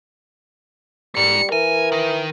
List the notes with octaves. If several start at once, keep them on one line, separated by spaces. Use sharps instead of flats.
G#2 G3 C#7
E3 A#4 G#5
D#3